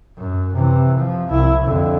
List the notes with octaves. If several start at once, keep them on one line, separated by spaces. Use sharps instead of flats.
F#2
C3 E3
F3
C2 E4
F2 D3